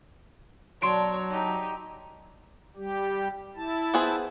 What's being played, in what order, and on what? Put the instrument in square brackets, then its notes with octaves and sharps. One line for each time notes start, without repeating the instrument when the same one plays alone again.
[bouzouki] B2 D4 A5 [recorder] F#3 [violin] C#5 [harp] C6 C7 D7
[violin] D#4 G4
[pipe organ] G3 G4
E4 A5
[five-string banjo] B3 G#4 C5